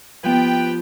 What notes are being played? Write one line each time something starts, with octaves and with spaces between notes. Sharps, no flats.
F3 B3 G4 B4 G5